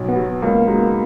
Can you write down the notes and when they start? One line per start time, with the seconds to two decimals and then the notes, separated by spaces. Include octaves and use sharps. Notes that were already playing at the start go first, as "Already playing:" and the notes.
Already playing: B1
0.08 B3
0.16 B2 F#3
0.42 C#2 A#3
0.67 B2 G#3 D#4